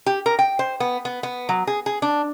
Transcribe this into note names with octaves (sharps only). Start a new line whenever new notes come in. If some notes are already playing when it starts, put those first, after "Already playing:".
G4
A#4
G5
C5
B3
B3
B3
F#3
G#4
G#4
D4